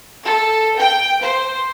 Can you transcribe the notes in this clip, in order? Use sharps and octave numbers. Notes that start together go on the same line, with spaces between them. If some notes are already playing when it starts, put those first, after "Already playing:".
A4
G5
C5